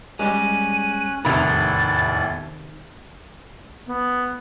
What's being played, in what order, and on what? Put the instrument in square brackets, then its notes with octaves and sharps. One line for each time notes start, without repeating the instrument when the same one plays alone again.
[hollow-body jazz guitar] G3 G#3 [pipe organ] C#4 F#6 [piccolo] D#7
[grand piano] F1 B5 [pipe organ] E2 A2 F#6 [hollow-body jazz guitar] C3 D#3 [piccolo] A6
[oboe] B3